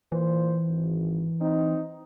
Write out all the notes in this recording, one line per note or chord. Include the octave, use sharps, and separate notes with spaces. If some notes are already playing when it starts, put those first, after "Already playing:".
A#2 E3 C5
G#1
C4 D#4